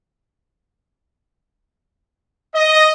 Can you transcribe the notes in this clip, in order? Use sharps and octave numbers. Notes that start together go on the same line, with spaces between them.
D#5